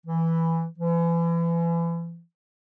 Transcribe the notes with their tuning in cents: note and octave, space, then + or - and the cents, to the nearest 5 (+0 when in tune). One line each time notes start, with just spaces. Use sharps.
E3 +0
E3 +35